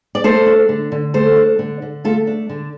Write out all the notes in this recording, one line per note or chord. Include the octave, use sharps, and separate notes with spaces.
D5
A3 A4 C5
D4
D3
D3
A3 A4 C5
D4
D3
D3
A3 F4 A4
D4
D3